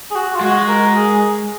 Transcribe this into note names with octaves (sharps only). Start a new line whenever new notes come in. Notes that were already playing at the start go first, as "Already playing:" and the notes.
G#4
F#4
F4
G#3 F#4
A#4
G#4